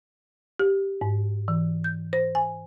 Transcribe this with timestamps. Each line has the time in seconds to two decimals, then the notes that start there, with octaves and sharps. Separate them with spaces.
0.60 G4
1.01 G#2
1.48 E3
1.84 G6
2.13 C5
2.35 G#5